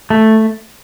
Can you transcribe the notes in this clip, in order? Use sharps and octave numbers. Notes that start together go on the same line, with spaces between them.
A3